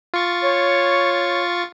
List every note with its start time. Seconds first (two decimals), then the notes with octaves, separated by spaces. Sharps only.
0.14 F4 C#6 A6
0.42 C#5